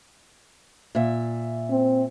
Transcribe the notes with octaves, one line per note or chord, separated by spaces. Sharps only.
A#2 E5
C4